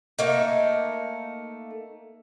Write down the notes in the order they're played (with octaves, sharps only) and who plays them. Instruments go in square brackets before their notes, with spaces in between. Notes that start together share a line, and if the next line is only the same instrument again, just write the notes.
[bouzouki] A3 A#3 D#4